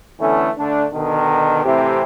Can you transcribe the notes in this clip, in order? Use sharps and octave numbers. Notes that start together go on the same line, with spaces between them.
D3 E3 A3 B3 C#4
D3 A3 D4
B2 D3 D#3
A2 C3 E3 C4 G4